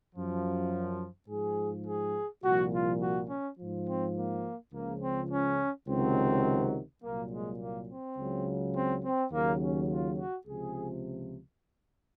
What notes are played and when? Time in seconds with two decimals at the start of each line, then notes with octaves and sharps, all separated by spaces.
0.14 F#2 F3
1.28 G#2 F3 G#4
1.86 G#4
2.44 C2 A#2 F3 F#4
2.73 F4
3.01 F#4
3.29 C#4
3.58 G#2 F3
3.87 C4
4.16 A#3
4.72 C#2 C#3 F3 A#3
5.01 C4
5.31 C#4
5.87 C#2 C3 D#3 F#3 C4
7.02 C2 A#2 F#3 A#3
7.31 G#3
7.59 A#3
7.89 C4
8.18 C#2 C#3 F#3
8.75 C4
9.04 C4
9.32 D#2 C#3 F#3 A#3
9.60 C#4
9.90 F4
10.18 F#4
10.46 C#2 C3 F3 G#4